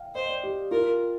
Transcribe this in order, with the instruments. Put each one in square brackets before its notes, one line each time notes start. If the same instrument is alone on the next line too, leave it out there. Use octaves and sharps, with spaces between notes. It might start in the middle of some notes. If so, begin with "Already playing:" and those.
Already playing: [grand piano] F5 G5
[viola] C5 [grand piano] D#5
[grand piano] D5
G4
[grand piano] F4 [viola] A#4